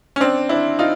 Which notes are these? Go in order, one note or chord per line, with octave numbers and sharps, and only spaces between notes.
C#4
C4 D4
D4 E4
D#4 F4